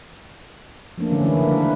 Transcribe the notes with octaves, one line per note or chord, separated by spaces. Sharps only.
F3 A3 A#3 D4
D3 E3 G#3 A3 C#4
D#3 A#3 C#4 E4
C#3 F3 A#3 D4
D4 B4